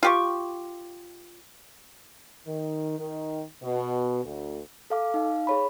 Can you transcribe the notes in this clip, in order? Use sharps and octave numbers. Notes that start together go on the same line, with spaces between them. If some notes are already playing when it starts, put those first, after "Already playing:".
F4 G4 C#6
D#3
D#3
B2
D2
A4 F5 D6
D#4 F5
G#4 C#5 B5